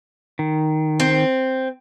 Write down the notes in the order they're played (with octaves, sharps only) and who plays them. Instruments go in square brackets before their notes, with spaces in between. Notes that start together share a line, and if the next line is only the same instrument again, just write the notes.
[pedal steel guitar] D#3
[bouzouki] C4